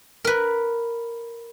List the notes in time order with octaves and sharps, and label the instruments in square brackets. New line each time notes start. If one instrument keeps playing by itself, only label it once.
[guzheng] A#4 B4